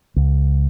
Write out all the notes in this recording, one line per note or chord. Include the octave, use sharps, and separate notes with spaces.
C#2